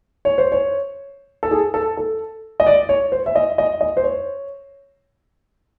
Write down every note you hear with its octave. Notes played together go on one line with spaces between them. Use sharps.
C#5
C5
C#5
A4
G#4
A4
A4
D#5
D5
C#5
C5
E5
D#5
D#5
D#5
C5
C#5